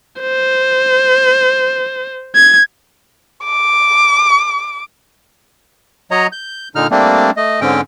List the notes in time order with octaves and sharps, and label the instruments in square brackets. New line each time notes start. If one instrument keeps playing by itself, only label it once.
[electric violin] C5
G#6
[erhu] D6
[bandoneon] F#3 C#5 D#5 A#5
G6
A#2 D3 D#4 F6
G3 A3 A#3 C4 D4
A3 D#5
G#2 D3 C4 C#4 G5